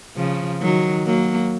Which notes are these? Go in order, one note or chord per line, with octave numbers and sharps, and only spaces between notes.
C#3 F3
D#3 F#3
F#3 A#3